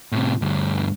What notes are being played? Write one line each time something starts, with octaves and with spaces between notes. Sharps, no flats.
A2 C3
D2 G2